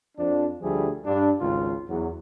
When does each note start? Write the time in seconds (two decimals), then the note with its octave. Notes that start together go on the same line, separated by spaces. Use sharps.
0.18 F2 F3 D4
0.61 D2 F3 G3 A3 G#4
1.05 G2 D4
1.39 G#1 C#2 F4
1.89 E2 F#3